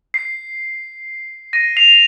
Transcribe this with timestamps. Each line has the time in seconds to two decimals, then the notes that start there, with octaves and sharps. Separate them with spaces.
0.14 C7
1.53 A#6 D#7
1.77 C7 F7